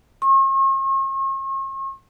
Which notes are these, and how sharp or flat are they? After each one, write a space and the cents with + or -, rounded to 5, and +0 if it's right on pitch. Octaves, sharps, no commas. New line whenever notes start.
C#6 -45